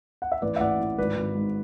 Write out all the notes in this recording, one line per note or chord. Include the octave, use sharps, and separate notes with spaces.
F#5
E5
A1 B4 D5
E5
A1 D5 F#5
A2
G#1 B4 D5
G#1
G#2